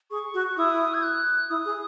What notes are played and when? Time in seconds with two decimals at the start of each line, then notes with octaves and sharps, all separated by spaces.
0.11 G#4 C#6
0.34 F#4
0.49 C#6
0.57 E4 D#6
0.94 G#6
1.03 F#6
1.49 E4 D#6
1.65 G#4